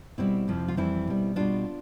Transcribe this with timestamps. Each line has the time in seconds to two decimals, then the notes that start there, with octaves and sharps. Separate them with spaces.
0.18 B2 G3 C4 E4
0.48 F2 C3 F3
0.68 F4
0.77 F2 E3 G3 C4 E4
1.07 B2 G3
1.36 B2 G3 D4 F4